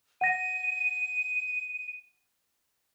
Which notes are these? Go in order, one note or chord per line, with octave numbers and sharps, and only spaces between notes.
F#5 A#6 D#7